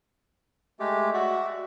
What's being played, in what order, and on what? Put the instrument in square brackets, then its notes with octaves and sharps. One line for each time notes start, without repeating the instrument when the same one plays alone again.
[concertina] G#3 A3 G4
[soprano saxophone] F#4 [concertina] D5 E5